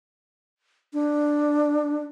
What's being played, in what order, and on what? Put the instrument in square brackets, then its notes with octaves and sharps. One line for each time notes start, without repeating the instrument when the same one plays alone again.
[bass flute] D4